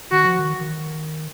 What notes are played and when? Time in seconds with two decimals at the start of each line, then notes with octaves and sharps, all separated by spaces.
0.11 D#3 F#4
0.25 F3
0.39 D#3
0.61 D#3